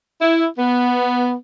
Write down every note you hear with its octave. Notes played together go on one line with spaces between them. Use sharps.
E4
B3